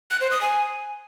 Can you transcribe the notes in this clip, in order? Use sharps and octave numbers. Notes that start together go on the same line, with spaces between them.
F#6
C5
D#6
G#5